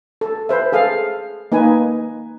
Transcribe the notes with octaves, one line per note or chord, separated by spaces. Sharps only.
A4
B4 C5 E5
G#4 A4 F5
A#3 D#4 B4 G#5